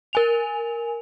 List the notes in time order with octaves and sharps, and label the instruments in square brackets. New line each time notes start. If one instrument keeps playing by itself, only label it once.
[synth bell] A#4 G#5 F7